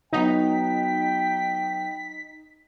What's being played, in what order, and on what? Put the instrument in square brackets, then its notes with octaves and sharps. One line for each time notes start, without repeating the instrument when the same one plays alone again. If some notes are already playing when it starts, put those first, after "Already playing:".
[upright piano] F#3 B3 F#4 [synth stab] D#4 [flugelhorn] G5 [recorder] B6